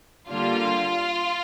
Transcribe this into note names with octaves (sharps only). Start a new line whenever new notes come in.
D3 G3 A#3 D4 F4